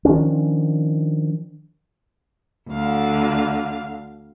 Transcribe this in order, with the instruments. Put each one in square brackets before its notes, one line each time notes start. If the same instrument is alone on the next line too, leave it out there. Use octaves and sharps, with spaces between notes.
[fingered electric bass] D#3 F3 C#4 D4
[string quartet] D2 D3 F5